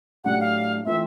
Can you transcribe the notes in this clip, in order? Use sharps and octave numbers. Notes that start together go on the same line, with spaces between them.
A2 F#3 A3 D4 G4 F#5
F5
E3 A3 C4 F4 E5